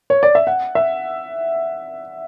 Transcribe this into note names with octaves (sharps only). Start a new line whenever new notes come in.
C#5
D5
E5
F#5
E5